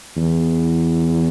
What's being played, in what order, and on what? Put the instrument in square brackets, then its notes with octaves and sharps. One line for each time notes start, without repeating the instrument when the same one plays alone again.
[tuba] E2